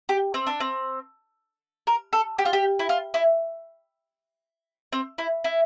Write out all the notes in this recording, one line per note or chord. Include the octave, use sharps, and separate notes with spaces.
G4
C4
D4
C4
A#4
A4
G4
F4
G4
E4
F4
E4
C4
E4
E4